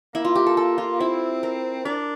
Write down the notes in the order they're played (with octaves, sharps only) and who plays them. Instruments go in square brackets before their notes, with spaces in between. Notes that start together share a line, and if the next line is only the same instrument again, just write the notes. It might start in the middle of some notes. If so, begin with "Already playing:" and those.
[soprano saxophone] A#3 [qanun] E4
[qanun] F4
G4
A4
A4
F4
[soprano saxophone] C4 [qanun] E4
[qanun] A#4
[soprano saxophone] D4 [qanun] A#4